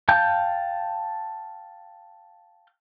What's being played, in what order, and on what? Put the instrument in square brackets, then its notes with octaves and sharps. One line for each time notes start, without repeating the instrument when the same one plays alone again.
[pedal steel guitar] F5 G5 A5 G6